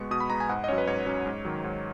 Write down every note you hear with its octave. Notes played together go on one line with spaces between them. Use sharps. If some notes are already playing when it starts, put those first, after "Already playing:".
Already playing: B2 G#3 B3 C#6
B2 D#6
B5
G#3 B3 A#5
G#5
G#2 F#5
D#5
F#3 C#4 C#5
B4
G#2 C#5
F#3 C#4
G#2
D#3 F#3
G#2